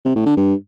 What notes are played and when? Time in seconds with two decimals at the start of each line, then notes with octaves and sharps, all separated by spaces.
0.05 C3
0.16 A2
0.26 D3
0.37 G2